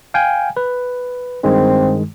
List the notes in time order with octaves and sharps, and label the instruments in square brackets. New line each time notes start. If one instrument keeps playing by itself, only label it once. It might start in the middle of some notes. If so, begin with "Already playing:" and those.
[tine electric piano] F5 G5 G#5
B4
[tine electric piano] G2 D#3 G#3 [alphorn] C4